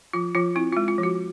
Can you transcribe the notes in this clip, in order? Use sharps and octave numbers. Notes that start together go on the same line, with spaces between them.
F3 F4
F3 F4
C4 E4
G#3 F4
F4
F3
F#4